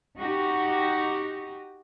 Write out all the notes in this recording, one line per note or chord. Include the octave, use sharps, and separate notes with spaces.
D#4 F#4 G4